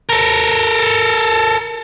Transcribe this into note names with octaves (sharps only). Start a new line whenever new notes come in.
A4 A#4